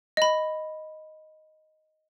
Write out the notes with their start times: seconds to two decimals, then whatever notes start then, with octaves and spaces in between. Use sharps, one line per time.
0.17 D#5 B5